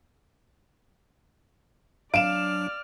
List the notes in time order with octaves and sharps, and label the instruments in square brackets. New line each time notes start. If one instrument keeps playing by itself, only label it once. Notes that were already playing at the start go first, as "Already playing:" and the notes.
[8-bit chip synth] F#3 D4 [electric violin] D5 F6 [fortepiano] F5 [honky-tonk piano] D7 E7